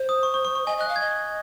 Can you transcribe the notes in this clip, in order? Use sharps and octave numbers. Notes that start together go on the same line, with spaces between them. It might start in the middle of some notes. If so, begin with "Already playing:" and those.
Already playing: C5
D#6
C#6
C#6
C#6
C#6
D#5 G#5
D#5 F#6
F5
D#5 G#6